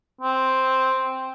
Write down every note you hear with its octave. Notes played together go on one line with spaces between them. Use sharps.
C4